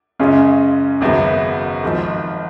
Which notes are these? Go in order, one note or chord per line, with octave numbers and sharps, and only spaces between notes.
F#2 C#3 G#3 C#4 F4
G#1 F#2 C#3 F#3 B3
G#1 G#2 F3